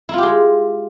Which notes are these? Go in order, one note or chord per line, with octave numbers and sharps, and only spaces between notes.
G#3 E4 F4 G4